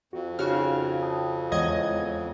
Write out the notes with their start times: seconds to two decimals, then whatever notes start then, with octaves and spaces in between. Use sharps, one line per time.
0.13 F2 F#4
0.39 C#3 D#4 F#4 F5 F6
1.02 G5 A5 D#6
1.52 E2 G#3 C#5 D#5 F#5 G#6